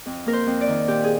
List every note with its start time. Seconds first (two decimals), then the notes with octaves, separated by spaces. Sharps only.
0.06 F2
0.26 A#3 A#4
0.33 C5
0.47 F2
0.61 D5
0.68 D#3
0.88 A#2 G4
1.04 G#4